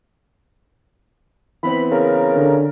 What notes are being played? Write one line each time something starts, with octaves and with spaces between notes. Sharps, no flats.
E3 B3 C4 B5
C#3 A#4
D3